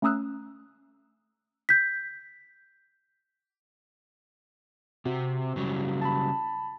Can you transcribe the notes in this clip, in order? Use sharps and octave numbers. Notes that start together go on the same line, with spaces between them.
A3 C#4 A#5 D#6 E6 F#6
G6 B6
C3 C4 F#4
C#3 F#3 G3
A5 B5